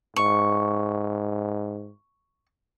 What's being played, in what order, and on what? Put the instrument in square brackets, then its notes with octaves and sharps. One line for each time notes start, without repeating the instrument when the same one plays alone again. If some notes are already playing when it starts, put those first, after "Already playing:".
[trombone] G#2 [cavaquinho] C#6